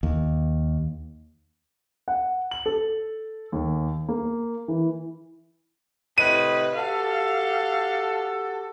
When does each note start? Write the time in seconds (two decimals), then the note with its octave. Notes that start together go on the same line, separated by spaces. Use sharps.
0.03 D#2
2.08 F#5
2.51 F#7
2.66 A4
3.52 D#2
4.08 A#3
4.68 E3
6.18 A2 C3 B4 D#5 D#7
6.75 F#4 G4 A4 F5